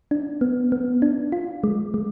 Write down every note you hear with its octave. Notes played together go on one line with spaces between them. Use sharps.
D4
B3
B3
D4
F4
G#3
G#3